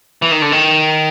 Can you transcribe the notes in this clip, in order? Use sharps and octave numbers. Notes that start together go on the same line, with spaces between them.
E3
D#3
D3
D#3